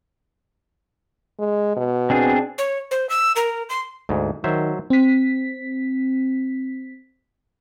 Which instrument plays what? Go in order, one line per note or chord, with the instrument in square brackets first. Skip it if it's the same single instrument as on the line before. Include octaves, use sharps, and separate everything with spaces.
[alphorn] G#3
B2
[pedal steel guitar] C4 D4 G#4
[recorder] C#5
C5
E6
A#4
C6
[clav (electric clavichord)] D2 G#2
[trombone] D#3 [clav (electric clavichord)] F#3 C5 E5
[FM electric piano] C4 B6